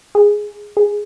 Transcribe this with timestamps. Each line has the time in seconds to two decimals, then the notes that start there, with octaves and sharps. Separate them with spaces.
0.15 G#4
0.77 G#4